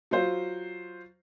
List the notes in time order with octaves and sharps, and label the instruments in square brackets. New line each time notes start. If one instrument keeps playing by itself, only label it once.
[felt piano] F#3 F4 C5